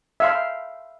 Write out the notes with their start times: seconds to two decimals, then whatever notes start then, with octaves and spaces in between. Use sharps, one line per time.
0.20 E5 F5 C6